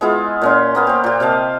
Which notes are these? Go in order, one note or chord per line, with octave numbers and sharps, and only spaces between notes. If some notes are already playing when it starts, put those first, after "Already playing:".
G#3 B3 E4 F4
A#2 C#4 C6
A#3 B3 F5
G4 C5
A#2 G4
C3 D#5 F5 A5